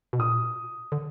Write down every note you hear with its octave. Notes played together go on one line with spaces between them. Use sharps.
B2
A#2 D#6
D3